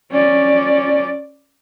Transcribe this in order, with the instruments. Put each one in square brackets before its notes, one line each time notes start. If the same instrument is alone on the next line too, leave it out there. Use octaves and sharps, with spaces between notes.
[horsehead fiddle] C#4 D5